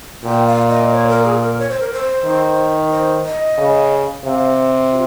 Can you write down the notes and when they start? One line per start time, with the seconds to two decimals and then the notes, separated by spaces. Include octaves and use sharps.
0.24 A#2 G5
0.47 F5
0.69 D#5
0.92 C#5
1.08 A#4
1.24 G#4
1.42 A#4
1.59 C#5
1.69 C5
1.80 A#4
1.92 C5
2.25 D#3
2.91 C5
3.25 D#5
3.58 C#3
4.25 C3 F5
4.92 F4